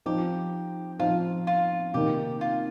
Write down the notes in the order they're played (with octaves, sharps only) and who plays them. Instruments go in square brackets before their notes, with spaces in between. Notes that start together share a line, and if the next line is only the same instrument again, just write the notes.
[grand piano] F3 C4 D#4 [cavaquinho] G4
[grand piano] F3 C4 D#4 [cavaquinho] F4
[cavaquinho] F4
[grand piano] C3 D#3 A#3 D#4 [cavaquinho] G4
[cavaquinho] F4